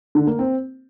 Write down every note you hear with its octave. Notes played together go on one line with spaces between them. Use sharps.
D3
A#3
C4